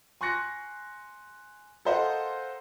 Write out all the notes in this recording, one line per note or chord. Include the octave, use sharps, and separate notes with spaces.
G#5 C6 C#6 F#6 A#6 C#7
A4 A#4 C5 D#5 F5 F#5